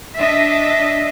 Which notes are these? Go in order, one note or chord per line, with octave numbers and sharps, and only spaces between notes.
D4 D#5 E5